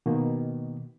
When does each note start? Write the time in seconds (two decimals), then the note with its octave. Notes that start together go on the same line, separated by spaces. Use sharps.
0.06 B2 D#3 A#3